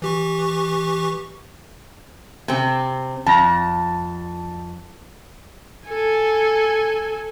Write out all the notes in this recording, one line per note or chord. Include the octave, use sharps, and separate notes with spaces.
E3 G4 C#6
C3 C4
F2 A5 A#6
A4 G#5